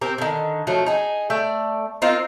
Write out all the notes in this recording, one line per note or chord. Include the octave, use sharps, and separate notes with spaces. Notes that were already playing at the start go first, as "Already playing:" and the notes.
C4 G4 A#4
D3 D#3
F3 F#3 A3
D#4 G#4
A3 D5 G5
C4 D#4 F4 A#4